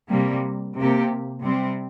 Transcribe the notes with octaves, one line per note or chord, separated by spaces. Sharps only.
C3 G3 A#3
C3 A#3 G4
C3 G3 C4